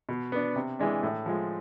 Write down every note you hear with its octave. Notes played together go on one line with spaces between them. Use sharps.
B2
B3 D4
C3
E3 G#3 D4
A2
F3 G#3